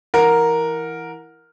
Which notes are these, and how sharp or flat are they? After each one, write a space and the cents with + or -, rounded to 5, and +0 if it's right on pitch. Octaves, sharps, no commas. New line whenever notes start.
E3 +0 A#4 +0 F#5 -20